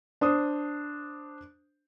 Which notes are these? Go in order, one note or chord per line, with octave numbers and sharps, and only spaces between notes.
D4 C5 D#6